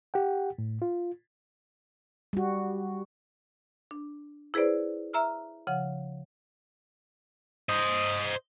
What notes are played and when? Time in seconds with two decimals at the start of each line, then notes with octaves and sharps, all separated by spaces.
0.14 G4 F#5 G5
0.58 A2
0.82 F4
2.33 G3 F#4
3.91 D4
4.54 E4 G#4 B4 C5 D5
5.13 E5 A#5 E6 F6
5.67 C#3 F3 F#5
7.69 C5 D#5